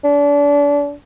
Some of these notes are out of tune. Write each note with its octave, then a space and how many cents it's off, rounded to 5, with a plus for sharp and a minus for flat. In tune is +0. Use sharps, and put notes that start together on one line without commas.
D4 -30